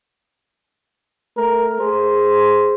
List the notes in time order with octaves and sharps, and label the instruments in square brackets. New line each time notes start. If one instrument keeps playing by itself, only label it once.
[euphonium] A3 [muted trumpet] A#4
[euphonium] G#4 [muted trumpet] C5